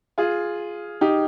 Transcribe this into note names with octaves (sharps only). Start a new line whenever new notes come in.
F4 G#4
D#4 G4